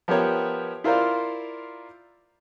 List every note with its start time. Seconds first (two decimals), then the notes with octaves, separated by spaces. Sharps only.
0.08 F3 B3 G4 A#4 C#5 E5
0.84 E4 F4 A#4 C5 D5 F5